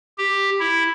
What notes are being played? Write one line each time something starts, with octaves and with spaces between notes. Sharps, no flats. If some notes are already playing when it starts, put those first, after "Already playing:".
G4
E4